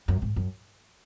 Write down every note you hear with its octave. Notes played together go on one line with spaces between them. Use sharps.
F#2
G#2
F#2